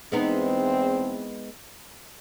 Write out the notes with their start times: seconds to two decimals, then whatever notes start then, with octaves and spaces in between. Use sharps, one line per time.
0.12 E2 G#3 B3 C4 D#4